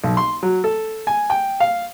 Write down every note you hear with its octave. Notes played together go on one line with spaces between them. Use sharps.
B1
C6
F#3
A4
G#5
G5
F5